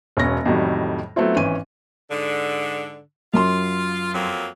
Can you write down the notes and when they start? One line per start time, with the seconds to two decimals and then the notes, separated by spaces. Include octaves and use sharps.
0.17 E1 B2 C#4 A#6
0.46 F2 A2 D#3 F#3 G3
1.16 F#3 A3 B3 C4 E4 F4
1.36 G#1 E3 C#4 D#7
2.10 G#2 D3
3.34 F#2 F4 C6
4.14 F2 F#3 A#3